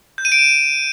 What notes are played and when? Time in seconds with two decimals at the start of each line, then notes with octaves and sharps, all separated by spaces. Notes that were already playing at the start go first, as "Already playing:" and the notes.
0.18 G6
0.25 D#7
0.32 D7
0.39 E7